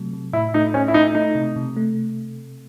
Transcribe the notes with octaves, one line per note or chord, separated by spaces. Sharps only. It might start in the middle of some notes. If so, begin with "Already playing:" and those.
Already playing: C3 F#3 A3
C3
A2 E4
A3 D#4
A3 C#4
E4
A3 D#4
A3 D#4
C3
C3
A3